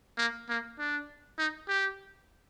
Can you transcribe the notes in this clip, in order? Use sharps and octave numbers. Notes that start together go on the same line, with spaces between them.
A#3
A#3
D4
D#4
G4